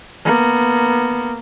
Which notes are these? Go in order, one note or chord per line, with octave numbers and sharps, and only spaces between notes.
A#3 B3